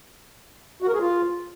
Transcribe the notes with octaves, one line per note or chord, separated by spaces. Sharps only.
F#4
A#4
G#4
F4